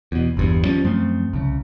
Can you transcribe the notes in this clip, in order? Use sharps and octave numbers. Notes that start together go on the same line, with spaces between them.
E2 B2
G1 E2 G2
D#3 F3 G3 C#4
F#2 F3 A3 C4
C2 C#3